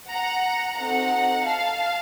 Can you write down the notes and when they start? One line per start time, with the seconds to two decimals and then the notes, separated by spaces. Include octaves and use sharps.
0.10 F#5 A#5
0.78 C4 D#4 F#4 A4 F#5 A#5
1.45 F5 A5